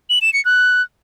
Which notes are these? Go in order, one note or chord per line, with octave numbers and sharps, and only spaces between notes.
F#7
E7
C#7
F#6